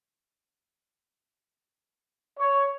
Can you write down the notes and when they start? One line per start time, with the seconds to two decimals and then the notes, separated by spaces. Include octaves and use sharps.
2.39 C#5